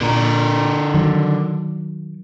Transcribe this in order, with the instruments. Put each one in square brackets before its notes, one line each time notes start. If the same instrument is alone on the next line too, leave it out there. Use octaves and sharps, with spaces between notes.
[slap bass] A#2 [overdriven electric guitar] D3 A#4
[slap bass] D#3 F#3